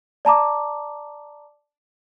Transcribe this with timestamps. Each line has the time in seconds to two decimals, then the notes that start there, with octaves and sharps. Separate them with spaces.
0.25 D5 A5 A#5 D6